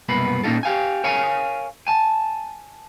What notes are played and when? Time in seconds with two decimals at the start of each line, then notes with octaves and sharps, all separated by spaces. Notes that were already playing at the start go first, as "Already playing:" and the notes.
0.09 C2 F#2 B2 A#3 B3 B5
0.44 A#2 A#3 C#4 D#4 F4 A4
0.63 G4 F5 G#5
1.04 A#4 C#5 F5 G#5
1.87 G#5 A5